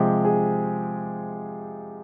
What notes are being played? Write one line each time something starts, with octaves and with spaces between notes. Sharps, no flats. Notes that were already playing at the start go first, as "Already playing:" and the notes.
Already playing: C3 F3 G#3 G4
G#4